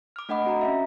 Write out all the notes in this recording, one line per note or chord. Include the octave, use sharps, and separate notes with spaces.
D6 F6
A3 D4 D#5 F#5 B5 D6
C4 F#4 A#5
C#4 E5